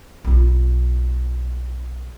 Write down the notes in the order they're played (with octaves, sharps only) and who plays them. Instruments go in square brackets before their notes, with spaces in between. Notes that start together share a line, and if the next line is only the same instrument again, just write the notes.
[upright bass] B1 F4